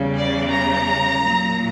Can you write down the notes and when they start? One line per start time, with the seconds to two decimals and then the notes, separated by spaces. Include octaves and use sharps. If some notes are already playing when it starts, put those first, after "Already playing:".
Already playing: E2 C#3 G3
0.16 D5
0.51 A#5
1.20 A#2 F#3